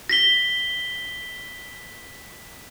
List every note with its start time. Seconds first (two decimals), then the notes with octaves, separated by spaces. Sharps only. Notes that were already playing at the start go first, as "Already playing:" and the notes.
0.09 A#6 B6 G7